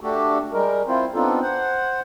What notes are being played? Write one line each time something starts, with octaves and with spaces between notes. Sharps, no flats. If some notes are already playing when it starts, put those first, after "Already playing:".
A3 D4 F#4 G4 A4
G3 G#3 A#4
C4 E4 F4 C5
B3 C4 D4 D#4 F4 A4
C5 F#5